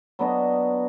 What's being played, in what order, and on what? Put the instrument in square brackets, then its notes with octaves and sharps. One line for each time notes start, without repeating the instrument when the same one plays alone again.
[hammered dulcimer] F#3 B3 D4 D#5